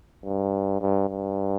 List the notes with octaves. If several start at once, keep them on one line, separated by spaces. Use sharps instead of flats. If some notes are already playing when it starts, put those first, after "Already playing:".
G2
G2
G2